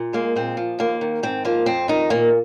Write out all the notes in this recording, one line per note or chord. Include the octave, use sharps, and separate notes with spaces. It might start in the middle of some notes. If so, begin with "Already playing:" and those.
Already playing: A#2
G#3 A#3
A#2 C4
F3
D#2 A#3
D#3
G#2 C4
F3 A#3
F2 C4
D#3 D#4
A#2 A#3